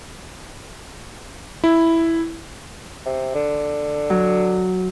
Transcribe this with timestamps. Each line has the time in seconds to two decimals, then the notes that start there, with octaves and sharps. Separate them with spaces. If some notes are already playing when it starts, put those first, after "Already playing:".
1.64 E4
3.06 C3
3.35 D3
4.10 F#3